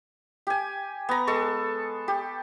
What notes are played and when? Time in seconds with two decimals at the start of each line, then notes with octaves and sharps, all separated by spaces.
0.47 G4 G#5
1.09 B3 A#5
1.27 G#3 A4 C#6
2.08 G4